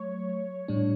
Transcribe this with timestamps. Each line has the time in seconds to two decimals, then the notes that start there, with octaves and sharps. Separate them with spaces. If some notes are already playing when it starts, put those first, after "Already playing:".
Already playing: F#3 A3 C#5
0.68 A2 G3 D4